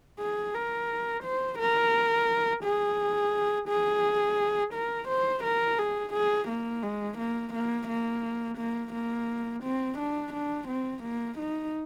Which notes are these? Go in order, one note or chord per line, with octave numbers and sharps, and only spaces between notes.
G#4
A#4
C5
A#4
G#4
G#4
A#4
C5
A#4
G#4
G#4
A#3
G#3
A#3
A#3
A#3
A#3
A#3
C4
D4
D4
C4
A#3
D#4